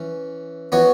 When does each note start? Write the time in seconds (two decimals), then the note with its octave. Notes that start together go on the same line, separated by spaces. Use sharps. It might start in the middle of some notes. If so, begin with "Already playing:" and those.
Already playing: E3 C#4
0.72 E3 B3 F#4 C#5